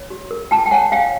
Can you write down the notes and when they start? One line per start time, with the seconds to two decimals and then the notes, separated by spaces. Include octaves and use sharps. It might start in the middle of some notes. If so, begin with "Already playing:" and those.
Already playing: C#5
0.10 F#4
0.31 A#4
0.51 F4 G5 A5
0.66 G5
0.71 C#5 F#5 G#5
0.92 C#5 F5 G5